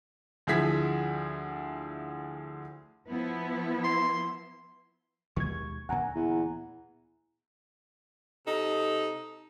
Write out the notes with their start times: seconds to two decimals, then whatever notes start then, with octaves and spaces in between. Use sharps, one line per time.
0.47 D2 F3 E4 G#4 G#6 B6
3.08 F3 B3 E4
3.84 C6
5.36 D#2 B2 G#3 C#6 G#6
5.89 D2 A#2 F#5 G#5 A#5
6.15 E2
8.45 C3 D#4 A4